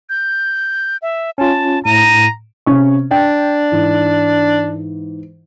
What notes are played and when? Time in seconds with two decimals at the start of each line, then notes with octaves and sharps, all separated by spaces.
0.09 G6
1.02 E5
1.38 C#4 F4 A5
1.85 A2 A#5 D#7
2.66 C3 C#4 C#6
3.11 D4 G5
3.72 G#2 E3